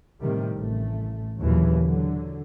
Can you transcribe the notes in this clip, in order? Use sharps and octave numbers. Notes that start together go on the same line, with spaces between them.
A2 C3 D#3 G3
A1 A3
D#2 A#2 C#3 E3 F#3
D3 F#3